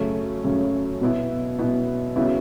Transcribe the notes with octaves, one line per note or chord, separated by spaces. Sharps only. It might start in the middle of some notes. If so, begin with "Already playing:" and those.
Already playing: F#2 C#3 A3 C#4
F#2 C#3 A3 C#4
B2 B3 E4
B2 B3 E4
C#3 F#3 B3 E4